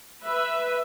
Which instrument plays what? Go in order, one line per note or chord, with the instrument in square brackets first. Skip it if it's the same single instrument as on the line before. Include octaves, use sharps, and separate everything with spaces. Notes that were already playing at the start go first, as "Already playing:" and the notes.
[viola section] B4 E5